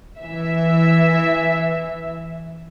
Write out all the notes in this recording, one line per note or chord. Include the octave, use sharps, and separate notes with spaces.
E3 E5